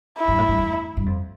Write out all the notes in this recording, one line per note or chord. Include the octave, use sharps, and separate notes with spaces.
E4
G2
A2
G2
E2
G2
F2